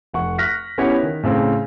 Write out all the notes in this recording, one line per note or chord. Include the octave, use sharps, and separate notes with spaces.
F1 F#5 C#6
C#6 F6 F#6 A#6 B6
B3 C#4 E4 G4 C#5 F#5
D#3
A2 C#3 C4